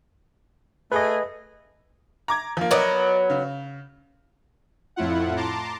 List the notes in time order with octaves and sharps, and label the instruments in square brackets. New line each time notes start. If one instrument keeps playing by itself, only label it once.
[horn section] A3 G#4 [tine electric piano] B4 D#5
[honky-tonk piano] A#5 D6 G#6
F3 A#3
[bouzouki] F#3 B3 [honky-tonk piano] A#4 D5 D#5
[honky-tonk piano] C#3
[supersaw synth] F2 A2 E4 F4 F#5
A5 A#5 C6 D6